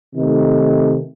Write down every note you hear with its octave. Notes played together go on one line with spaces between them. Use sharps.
C3 D#3 A3 D#4